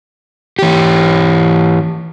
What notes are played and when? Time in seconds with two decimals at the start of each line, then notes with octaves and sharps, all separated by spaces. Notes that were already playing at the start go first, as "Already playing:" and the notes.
0.59 E3 G4